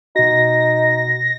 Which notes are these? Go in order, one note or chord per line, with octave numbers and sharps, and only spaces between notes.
B2 D#4 F#4 A#6